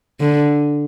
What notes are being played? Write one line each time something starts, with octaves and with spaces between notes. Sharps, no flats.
D3